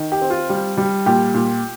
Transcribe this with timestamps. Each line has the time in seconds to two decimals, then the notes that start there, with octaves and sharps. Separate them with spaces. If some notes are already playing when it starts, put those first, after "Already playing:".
Already playing: D#3
0.12 G4
0.22 C4
0.30 F4
0.50 G3
0.78 G3
1.06 A#2 G4
1.34 A#2